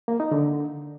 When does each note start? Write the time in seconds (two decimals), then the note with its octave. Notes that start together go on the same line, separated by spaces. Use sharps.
0.08 A#3
0.20 D#4
0.32 D3